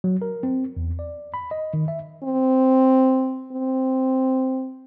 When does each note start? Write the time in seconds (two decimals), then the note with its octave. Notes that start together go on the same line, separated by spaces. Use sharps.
0.04 F#3
0.22 A#4
0.43 C4
0.77 E2
0.99 D5
1.34 B5
1.51 D#5
1.74 D#3
1.88 E5
2.24 C4
3.52 C4